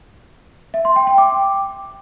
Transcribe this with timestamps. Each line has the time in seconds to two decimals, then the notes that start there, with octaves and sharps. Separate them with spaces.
0.74 E5
0.85 C6
0.96 G5
1.07 G5
1.18 D6